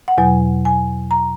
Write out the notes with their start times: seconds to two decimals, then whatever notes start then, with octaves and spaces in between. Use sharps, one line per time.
0.08 F#5
0.18 E2 B2 F#3 G#5
0.65 G#5
1.11 A#5